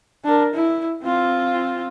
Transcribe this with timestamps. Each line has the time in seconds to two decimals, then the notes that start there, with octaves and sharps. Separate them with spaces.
0.24 D4 A#4
0.54 E4
1.03 C4 F4